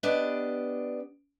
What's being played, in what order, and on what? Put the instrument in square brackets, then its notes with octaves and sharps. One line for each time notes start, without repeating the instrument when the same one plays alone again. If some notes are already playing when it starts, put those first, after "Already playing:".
[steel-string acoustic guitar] B3 D4 G4 D5 D#5